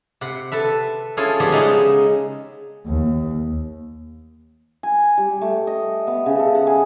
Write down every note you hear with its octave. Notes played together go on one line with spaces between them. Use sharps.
C3 F#5 B5
A4 B4 E5
C#4 E4 F4 G#4 A4
F3 G3 B3 G4 G#4
C#3 G#3 D#4 E5 F#5
D#2
G#5
G3
A3
D#5
B3
C#3
A4
F#5
G#4